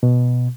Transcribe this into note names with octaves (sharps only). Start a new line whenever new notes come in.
B2